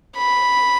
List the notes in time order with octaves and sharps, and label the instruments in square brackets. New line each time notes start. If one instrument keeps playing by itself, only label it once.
[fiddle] B5